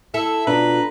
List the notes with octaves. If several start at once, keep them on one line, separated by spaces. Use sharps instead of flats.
E4 A4
B2 D4 F4 B4 A#5